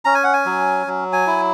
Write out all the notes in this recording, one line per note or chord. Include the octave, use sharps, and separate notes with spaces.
C#4 A#5
G#5
F#5
G#5
F#3
F#3
G#5
E4